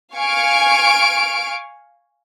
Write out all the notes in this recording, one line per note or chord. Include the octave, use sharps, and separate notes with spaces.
F5 G#5 C#6 F6 D7